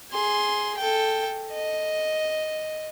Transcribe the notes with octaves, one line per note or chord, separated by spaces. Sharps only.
G#4 C6
A4 G5
D#5